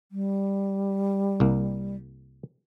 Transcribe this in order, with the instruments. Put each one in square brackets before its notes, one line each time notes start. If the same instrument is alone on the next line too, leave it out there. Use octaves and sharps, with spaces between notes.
[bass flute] G3
[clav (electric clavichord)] C2 A#3